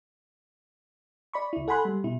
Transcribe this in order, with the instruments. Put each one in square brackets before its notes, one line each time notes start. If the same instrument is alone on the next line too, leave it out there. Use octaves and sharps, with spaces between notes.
[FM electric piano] D5 B5 C#6
C#2 E4
A4 F#5 G#5 B5 C6 F#6
G3
B2 E4